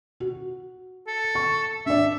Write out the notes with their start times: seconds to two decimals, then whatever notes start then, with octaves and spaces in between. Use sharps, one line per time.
0.20 F#4
1.07 A4
1.35 C#6
1.86 D4 D5 E5